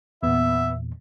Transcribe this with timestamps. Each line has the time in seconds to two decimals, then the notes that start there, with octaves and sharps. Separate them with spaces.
0.23 E2 A#2 B3 E5